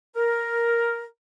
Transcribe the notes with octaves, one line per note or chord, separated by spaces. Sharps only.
A#4